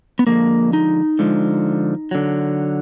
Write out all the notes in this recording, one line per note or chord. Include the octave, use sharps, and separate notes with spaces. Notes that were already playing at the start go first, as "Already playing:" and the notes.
B3
D3 F3 G#3 A#3
D#4
D3 F3 G#3
D3 F#3